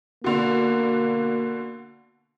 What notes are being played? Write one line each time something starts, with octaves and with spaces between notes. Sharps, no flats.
B2 D3 A#3